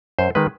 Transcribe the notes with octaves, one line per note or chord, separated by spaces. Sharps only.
F#2 C5
D#3 G#3 B4